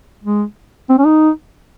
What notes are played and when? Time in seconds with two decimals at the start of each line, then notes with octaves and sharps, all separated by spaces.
0.24 G#3
0.89 C4
0.98 C#4
1.06 D#4